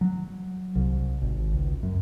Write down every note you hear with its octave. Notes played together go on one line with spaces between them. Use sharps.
F#3
C2
G#1
C#2
F#2